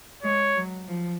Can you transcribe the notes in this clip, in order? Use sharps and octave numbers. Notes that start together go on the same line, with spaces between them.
G#3 C#5
F#3
F3